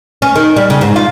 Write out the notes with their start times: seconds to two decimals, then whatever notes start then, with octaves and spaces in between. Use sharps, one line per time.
0.22 C#4
0.36 D#3
0.56 G3
0.70 C#3
0.81 G#2
0.96 F4